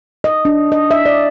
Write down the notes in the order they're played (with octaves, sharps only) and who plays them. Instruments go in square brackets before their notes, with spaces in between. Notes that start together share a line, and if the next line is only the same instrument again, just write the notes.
[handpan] D#5
D4
D#5
E5
D5